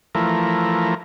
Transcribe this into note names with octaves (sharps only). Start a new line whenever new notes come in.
E3 F3 A3 A#4